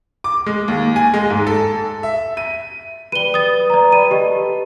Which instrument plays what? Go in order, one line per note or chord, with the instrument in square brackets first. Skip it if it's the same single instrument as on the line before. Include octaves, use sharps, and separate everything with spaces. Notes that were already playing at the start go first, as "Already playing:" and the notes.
[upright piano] D6
G#3
D#2
G#5
G#3
G#2
A4
E5
D#7
[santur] G3 B4 [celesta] D#7 G7
[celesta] D#6 A6
D5 A#5
[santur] G3 B5 [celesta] D#7
[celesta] G4 D#5 [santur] A4